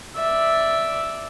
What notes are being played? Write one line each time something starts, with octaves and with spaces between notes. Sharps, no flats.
D5 E5